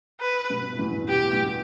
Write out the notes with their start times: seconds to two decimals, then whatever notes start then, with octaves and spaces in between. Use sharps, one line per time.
0.20 B4
0.50 G2 B2
0.72 A2
0.79 E2 G2
1.08 B2 G4
1.20 A2
1.33 G2
1.45 A2